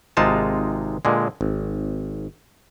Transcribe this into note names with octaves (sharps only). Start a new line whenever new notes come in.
G#1 C3 G#3 D#4 F4 A5
A#2 D3 G#3
G#1